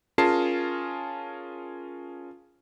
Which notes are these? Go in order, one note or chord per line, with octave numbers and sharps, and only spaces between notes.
C#4 F4 G#4 A#4 A5 C7